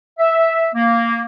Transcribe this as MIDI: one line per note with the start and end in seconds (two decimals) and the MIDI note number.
0.19 0.69 76
0.75 1.24 58